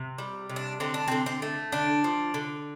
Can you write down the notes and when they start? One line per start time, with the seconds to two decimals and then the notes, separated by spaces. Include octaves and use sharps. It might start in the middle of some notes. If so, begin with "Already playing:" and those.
Already playing: C3
0.18 G3
0.49 C3
0.56 D4
0.80 D3 C4
0.94 D4
1.08 D3 C4
1.26 C4
1.42 A3
1.72 D3 D4
2.04 F3
2.34 D3